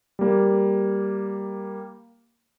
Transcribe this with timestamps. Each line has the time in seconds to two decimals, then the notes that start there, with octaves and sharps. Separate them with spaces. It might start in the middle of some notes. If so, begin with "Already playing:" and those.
0.19 G3 A#3